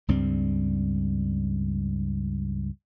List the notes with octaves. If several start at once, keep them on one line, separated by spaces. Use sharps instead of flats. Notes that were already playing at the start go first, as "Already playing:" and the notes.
C#2 G2 G3 C4